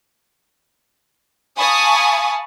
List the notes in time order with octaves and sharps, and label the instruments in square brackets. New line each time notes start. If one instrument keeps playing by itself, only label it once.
[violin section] F5 G#5 A5 B5 C#6 D#6